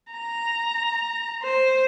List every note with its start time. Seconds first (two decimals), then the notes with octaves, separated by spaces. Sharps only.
0.12 A#5
1.43 C5